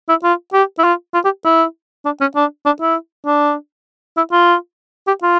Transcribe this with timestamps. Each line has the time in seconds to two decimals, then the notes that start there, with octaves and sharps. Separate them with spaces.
0.09 E4
0.24 F4
0.53 G4
0.79 E4
0.84 F4
1.14 F4
1.25 G4
1.45 E4
2.05 D4
2.21 C#4
2.36 D4
2.66 D4
2.81 E4
3.26 D4
4.17 E4
4.32 F4
5.07 G4
5.23 F4